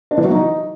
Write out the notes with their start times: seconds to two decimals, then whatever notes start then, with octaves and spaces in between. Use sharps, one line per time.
0.11 D4
0.18 E3
0.24 F#3
0.31 D#4